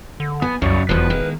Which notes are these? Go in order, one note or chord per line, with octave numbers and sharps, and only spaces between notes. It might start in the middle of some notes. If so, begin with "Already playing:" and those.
D3
B3 G#5
C2 F#2 C#3 C#5 D5
E1 E2 B2 F3 B4
D#3 G#3 A#3